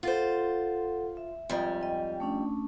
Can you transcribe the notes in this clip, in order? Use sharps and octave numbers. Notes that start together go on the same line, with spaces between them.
F4 A4 C5 F#5
E5
F2 G#2 G3
D#5 G5
A3 C#4 D4